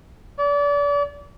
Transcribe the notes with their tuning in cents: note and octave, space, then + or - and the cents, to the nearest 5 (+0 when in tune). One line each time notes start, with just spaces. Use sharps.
D5 -35